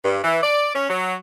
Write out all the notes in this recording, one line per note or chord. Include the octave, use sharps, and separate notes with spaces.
G2
E3
D5
C#4
F#3